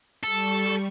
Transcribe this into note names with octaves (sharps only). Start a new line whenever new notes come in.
G3 A4 C#6